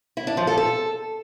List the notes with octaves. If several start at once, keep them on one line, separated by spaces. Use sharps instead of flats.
E4
D4
F3
A4
A4